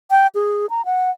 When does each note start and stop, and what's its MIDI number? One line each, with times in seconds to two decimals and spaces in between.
0.11 0.27 79
0.35 0.66 68
0.70 0.85 82
0.85 1.11 78